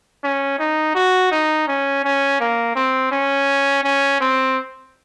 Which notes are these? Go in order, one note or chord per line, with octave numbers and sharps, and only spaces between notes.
C#4
D#4
F#4
D#4
C#4
C#4
A#3
C4
C#4
C#4
C4